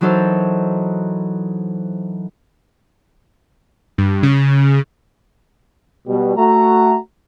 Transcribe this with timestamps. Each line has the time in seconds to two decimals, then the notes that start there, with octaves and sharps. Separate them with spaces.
0.01 E3 F#3 D#4 A4 A#4 C5
3.98 G2
4.23 C#3
6.08 B2 G3
6.37 A3 F#4 A#5